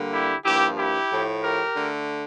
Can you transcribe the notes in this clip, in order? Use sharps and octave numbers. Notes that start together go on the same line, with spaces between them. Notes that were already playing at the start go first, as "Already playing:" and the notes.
Already playing: D3 G3 A#3
E4 G4
G2 F3 A#3 E4 G4
E4 G4
A2 F3 A3
G4 A#4
D3 A3